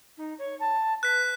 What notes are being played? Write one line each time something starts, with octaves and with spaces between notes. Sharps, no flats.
D#4
C#5
A5
B4 F#6 B6